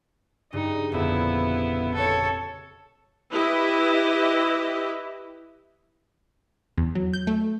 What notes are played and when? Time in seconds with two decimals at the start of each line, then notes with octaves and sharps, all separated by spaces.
0.52 G2 C#3 D#4
0.92 G1 F2 A#2 B3 E4
1.94 A4 C#5
3.31 E4 G4 B4 D#5
6.77 E2
6.95 F#3
7.13 G6
7.27 A3